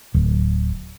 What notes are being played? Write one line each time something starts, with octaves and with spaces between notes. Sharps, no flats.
D1